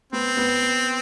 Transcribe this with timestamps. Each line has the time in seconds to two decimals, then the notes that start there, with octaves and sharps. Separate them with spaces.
0.13 B3 C4
0.37 B3